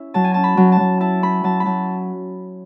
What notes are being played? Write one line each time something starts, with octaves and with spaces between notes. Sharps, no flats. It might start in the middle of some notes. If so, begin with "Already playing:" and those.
Already playing: C#4 E4
F#3 A5
G#5
C#4 A5
B5
F#3
A5
F#3
E4 A5
C#4 B5
F#3 A5
B5
F#3 A5